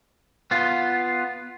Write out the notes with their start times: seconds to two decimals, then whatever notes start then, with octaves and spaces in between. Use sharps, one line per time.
0.51 B3 F4